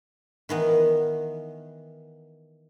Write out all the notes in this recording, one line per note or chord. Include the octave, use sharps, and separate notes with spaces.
D#3 E3 B3